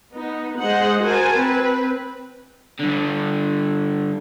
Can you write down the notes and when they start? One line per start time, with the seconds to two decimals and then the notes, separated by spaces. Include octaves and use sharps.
0.14 B3 D#4
0.60 G#3 G#4 C5 D#5 F#5
1.03 F#4 A#4 C5 G#5 A5
1.37 C4 B4
2.80 G2 D3